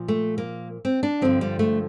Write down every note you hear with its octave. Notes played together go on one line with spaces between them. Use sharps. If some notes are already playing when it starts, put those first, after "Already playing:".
Already playing: A#2 F3
A3
A#3
C4
D4
G2 D3 F3 C4
G3
A3